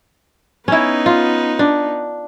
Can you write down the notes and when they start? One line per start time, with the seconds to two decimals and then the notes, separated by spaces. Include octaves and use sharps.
0.68 B3 C#4 D#4 E4
1.06 F4
1.59 D4